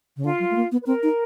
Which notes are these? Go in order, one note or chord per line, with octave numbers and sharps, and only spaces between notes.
C#3
D3 F4
F#3
A3
A#3
B3
B4
C4 A#4
D#4